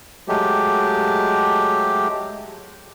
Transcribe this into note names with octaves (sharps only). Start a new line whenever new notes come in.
F#3 G#3 A3 G4